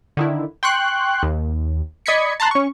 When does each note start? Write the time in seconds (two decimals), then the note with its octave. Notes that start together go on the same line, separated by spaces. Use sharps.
0.17 D3 D#3 E4
0.63 G5 C6 C#6 F#6
1.23 D#2
2.06 D5 D#5 B5 G#6 B6 C#7
2.40 A5 A#5 C6 F#6
2.51 C#4 C#6